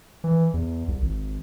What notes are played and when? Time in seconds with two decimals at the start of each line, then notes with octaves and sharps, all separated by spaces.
0.24 E3
0.54 E2
0.88 C2
1.02 G#1